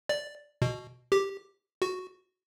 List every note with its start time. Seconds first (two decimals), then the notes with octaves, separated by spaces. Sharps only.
0.09 D5
0.62 B2
1.12 G4
1.82 F#4